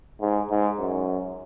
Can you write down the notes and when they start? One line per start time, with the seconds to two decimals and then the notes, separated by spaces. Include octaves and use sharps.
0.21 G#2
0.50 G#2
0.79 F#2